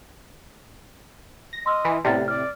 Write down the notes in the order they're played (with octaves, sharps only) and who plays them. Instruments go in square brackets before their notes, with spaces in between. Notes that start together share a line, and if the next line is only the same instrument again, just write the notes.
[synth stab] A#6
[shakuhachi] D#5 [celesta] C6 E6 F6
[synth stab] E3
[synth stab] A2 C3 [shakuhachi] B3 [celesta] D5 F6 A6
[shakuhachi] D5 [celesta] F6